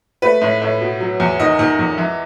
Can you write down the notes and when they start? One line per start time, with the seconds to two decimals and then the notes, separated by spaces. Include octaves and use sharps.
0.22 A3 B4
0.41 A2
0.61 A2
0.81 B2
1.00 F#3
1.20 E2
1.39 D#3 D#5
1.59 D#3
1.79 E2
1.98 E3